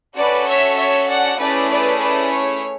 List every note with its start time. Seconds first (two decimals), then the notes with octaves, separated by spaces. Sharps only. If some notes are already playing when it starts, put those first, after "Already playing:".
0.16 C#4 F#4 A4 B4 D5
0.46 C#5 E5
0.77 C#5 E5
1.08 D5 F#5
1.38 A3 C#4 E4 G#4 B4 D5
1.68 B4 D5
1.99 B4 D5
2.30 C#5